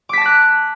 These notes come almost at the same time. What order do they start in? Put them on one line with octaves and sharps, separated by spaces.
D6 B6 A5 A#6 F#6